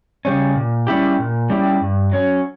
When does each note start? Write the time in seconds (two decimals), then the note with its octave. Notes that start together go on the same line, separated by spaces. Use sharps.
0.25 C#3 G3 C#4
0.56 A#2
0.87 G3 C#4 E4 G4
1.19 A#2
1.50 G3 C#4 E4 G4
1.81 G2
2.12 F#3 C#4